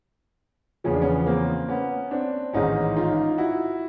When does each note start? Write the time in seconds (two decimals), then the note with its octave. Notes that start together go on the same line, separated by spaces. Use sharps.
0.84 E2 C#3 F3 C#4
0.93 D4
1.02 B3 C#4
1.26 A#3 C4
1.69 B3 C#4
2.11 C4 D4
2.53 A1 G#2 D#3 C#4 D#4
2.96 D#4 F4
3.38 E4 F#4